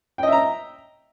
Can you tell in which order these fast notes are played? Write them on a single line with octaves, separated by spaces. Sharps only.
G5 D#5 E5 A#5